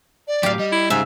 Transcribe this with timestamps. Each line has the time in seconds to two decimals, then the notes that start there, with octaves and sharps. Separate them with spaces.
0.28 D5
0.43 A2 F#3 G4 F5
0.59 G3 D#5
0.72 E4
0.90 G#2 C#3 G3 E5